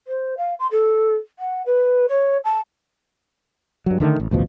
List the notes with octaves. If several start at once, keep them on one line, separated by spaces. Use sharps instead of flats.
C5
F5
C6
A4
F#5
B4
C#5
A5
G2 F#3
D3 D#3 G#3 A3
A1
A1 D2 B2 F3